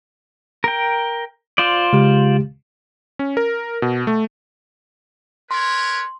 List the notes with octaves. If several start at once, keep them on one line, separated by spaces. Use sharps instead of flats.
A#4 G5
F4 C5 D5
C#3 G#3 G4
C#4
A#4
B2
A3
A#4 B4 C#5 C6